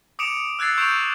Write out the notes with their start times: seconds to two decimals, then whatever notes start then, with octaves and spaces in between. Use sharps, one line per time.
0.19 D6 D#6 C#7 D7 E7 F7
0.59 E6 F#6 G#6 A6 C7
0.78 C#6 E6 G6 D7 E7 F7